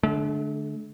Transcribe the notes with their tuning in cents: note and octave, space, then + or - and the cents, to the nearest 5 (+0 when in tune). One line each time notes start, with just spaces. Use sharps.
D3 +0 A3 -45